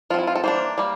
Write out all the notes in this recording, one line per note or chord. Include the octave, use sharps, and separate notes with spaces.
F3 C4 E4 F4
F4
A4
E3 A#3 D4 C5
G3 A#3